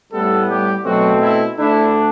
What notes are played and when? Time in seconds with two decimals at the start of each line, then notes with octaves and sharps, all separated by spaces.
0.12 A2 G3 A3 B3 A4
0.49 G3 G4
0.85 B2 F#3 A3 C4 F#4
1.21 E4
1.57 D2 D3 A3 D4 E4